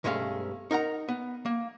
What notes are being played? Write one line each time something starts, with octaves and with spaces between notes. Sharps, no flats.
B1 G2 G#3 A3 C#4 F5
D#4 A#4 F#5 A#5
B3
A#3